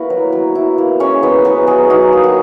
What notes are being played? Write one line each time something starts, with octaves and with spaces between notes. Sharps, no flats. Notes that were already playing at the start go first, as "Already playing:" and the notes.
Already playing: A#3 B3 E4 F#4 B4 F#5
F#3
F#3
E4
A#3
G#3 C#4 C#5
G#3 B3 B4
F#3 B3 B4
F#3 G#4
D#4 F#4
A#3
F#4